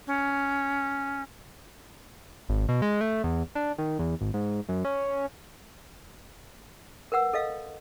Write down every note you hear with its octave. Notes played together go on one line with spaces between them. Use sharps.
C#4
G#1
B2
G#3
A3
E2
D4
D#3
E2
G#1
G#2
F#2
C#4
A#4 B4 F#5 E6
A4 D#5 F5